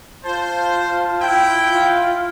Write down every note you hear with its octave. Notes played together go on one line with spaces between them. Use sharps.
F4 C5 A5
E4 G5
F4